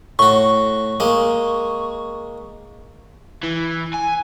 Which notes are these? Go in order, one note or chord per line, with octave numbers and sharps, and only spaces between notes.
A2 F#4 C#6
G#3 A#3
E3
G#5